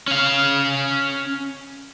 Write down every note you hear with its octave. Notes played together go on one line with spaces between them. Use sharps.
C#4 F5